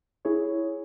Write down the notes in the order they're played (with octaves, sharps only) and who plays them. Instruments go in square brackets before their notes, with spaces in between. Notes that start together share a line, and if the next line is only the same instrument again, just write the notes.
[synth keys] E4 G#4 C#5